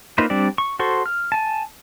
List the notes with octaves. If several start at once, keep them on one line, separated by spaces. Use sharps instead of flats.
A#3 D#4 F4 B4 C5
G3 C4 D4 D5
C#6
F#4 A4 C5 C6 C#6
F6
G#5 A5